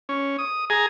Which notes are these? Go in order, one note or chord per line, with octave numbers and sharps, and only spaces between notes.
C#4
D#6
G#4 G#5 A#5